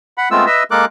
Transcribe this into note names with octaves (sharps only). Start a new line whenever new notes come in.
F#5 B5
G#3 A3 B3 C4 F4 E6
B4 D#5 E5 E6
G#3 A#3 A4 A#4 D6 F#6